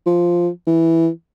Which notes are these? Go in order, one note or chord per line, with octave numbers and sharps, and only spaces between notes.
F3
E3